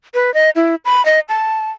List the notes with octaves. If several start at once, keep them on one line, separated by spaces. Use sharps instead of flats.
B4
D#5
E4
B5
D#5
A5